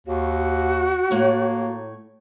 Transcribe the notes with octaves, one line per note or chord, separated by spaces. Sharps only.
D#2 F#4
A2 A#3 C#5